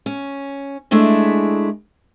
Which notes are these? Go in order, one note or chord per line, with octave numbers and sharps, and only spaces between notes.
C#4
G#3 A3 D4 E4 G#4